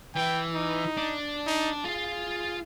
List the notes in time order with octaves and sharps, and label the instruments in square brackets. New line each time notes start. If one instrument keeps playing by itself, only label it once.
[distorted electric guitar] E3 [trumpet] G5
[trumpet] D#4
[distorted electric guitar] D4
[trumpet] D#4
[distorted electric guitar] F4 F5 [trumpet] G#4